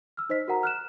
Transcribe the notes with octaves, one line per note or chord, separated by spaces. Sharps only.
E6 F6
D#4 C5 D#5 B6
F#4 A#4 F#5 A#5
F6 F#6 E7